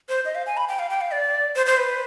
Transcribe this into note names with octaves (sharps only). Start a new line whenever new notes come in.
C5
D#5
F5
G#5
B5
G5
F5
G5
F5
D5
C5
C5
B4